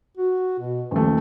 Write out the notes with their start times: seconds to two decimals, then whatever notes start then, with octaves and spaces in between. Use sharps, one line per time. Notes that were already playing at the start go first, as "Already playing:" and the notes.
0.17 F#4
0.59 B2
0.91 D#1 F3 A3